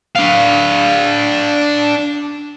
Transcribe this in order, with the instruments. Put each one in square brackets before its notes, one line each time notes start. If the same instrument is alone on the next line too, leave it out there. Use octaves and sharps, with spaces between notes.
[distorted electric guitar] D4 F5